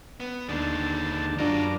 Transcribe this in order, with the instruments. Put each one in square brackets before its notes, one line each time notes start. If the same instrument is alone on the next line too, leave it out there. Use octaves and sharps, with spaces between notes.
[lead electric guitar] B3
[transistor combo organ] D#2 D3 A5 [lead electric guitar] G#3 D4
[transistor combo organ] F#2 A#4 D6 [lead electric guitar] G3 F4 [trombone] D4